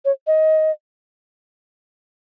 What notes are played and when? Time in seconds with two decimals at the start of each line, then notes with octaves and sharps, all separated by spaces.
0.05 C#5
0.27 D#5